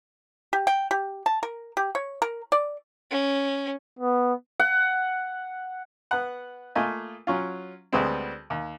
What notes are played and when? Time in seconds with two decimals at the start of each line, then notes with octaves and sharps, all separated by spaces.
0.53 G4
0.67 G5
0.91 G4
1.26 A5
1.43 A#4
1.77 G4
1.95 C#5
2.22 A#4
2.52 D5
3.11 C#4
3.99 B3
4.60 F#5
6.11 B3 F#5
6.75 A3 A#3 F4 D#5 G#5
7.27 F#3 C#4 F4
7.93 D2 G3 G#3 B3 C4
8.50 D#2